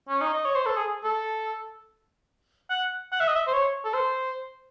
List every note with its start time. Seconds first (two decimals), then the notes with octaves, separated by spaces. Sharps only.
0.09 C#4
0.21 D#4
0.34 D#5
0.45 C#5
0.55 C5
0.66 A4
0.77 G#4
1.04 A4
2.70 F#5
3.12 F#5
3.20 E5
3.28 D#5
3.36 E5
3.47 C5
3.53 C#5
3.84 A4
3.94 C5